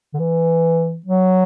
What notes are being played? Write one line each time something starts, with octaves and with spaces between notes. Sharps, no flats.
D3
E3
F#3